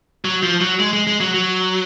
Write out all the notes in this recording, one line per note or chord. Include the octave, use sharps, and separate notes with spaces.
F#3
F3
F#3
G#3
G#3
G#3
F#3
F#3